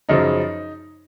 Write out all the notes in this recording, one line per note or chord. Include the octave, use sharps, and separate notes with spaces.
F#2 C#3 F3 D#4